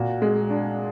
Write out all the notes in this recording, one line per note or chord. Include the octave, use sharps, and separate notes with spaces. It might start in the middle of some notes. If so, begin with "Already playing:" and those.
Already playing: A#2 F#4
G#3
D4